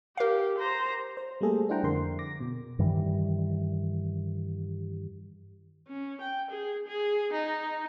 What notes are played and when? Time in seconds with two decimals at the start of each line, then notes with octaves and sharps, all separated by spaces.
0.17 G4 A#4 F5
0.59 C5 A#5
1.17 C5
1.41 G3 A3 A#3 G#4 A4
1.69 D4 E4 C5 F#5 G5 A#5
1.83 F2 D3 A#4 C6
2.19 D6 A#6
2.40 B2
2.79 G2 D#3 E3 G3
5.88 C#4
6.21 G5
6.50 G#4
6.88 G#4
7.33 D#4